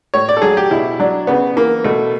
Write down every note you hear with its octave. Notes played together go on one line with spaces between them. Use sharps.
A2 C#5
D5
A4
F#3 G#4
G4
B2 E4
F#3 D4
C#3 B3
E3 A#3
B2 A3